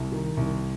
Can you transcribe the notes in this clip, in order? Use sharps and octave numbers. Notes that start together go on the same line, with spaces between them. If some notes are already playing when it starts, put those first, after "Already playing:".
Already playing: C2
D#3
C2